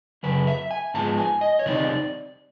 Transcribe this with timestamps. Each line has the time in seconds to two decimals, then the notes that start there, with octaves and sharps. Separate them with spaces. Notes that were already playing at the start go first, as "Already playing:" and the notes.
0.23 F#2 C#3 F#3 B4
0.47 E5
0.71 G#5
0.94 G#2 F3 G#3 B3 A5
1.18 G#5
1.41 D#5
1.59 C#5
1.66 C3 D#3 G3 C4 D#4 D5